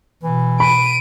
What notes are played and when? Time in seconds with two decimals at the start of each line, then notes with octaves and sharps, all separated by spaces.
0.23 B2 E3
0.60 B5 D7 D#7